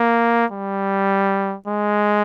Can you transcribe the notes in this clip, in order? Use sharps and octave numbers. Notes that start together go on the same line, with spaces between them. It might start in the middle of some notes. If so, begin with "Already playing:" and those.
Already playing: A#3
G3
G#3